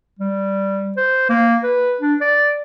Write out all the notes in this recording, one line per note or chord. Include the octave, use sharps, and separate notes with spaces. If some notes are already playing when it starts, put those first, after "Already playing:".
G3
C5
A#3
B4
D4
D5